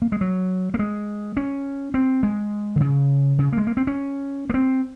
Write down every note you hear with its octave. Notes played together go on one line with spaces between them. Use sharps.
A#3
G#3
F#3
A#3
G#3
C#4
C4
G#3
D#3
C#3
C#3
A#3
G#3
A#3
C4
C#4
A#3
C4